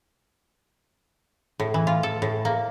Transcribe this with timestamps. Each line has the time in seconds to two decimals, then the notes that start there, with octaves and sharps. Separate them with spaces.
1.60 A2
1.74 E3
1.87 F4
2.03 A4
2.22 A2
2.45 A#3